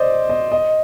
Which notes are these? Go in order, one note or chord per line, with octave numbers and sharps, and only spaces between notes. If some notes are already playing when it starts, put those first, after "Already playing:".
Already playing: C5 D5 D#5
D#5
D#5